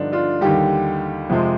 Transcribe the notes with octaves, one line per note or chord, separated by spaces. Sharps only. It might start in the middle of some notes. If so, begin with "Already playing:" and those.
Already playing: G2 D3 F3 D4 D#4
D4 F4
D#2 D3 G3 D#4 G4
F2 C3 F3 G#3